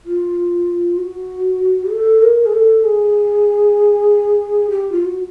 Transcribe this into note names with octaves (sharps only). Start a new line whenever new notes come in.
F4
F#4
A4
A#4
G#4
A4
G#4
G4
F4
F#4